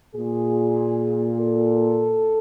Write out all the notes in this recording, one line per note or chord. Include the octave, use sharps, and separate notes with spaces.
A#2 G#4
A4